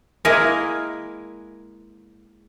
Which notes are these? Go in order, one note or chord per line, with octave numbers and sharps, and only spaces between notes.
G#3 A#3 E4 G#4 A#4